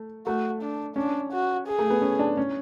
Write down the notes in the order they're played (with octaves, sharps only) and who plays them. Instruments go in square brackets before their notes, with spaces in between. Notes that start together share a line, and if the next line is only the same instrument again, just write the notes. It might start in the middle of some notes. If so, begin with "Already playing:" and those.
Already playing: [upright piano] A3
[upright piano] A3 [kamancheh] F#4
[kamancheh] D4
[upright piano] C#4 [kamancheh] D4
[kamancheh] F#4
G#4
[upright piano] A3
B3
C#4
D4
C#4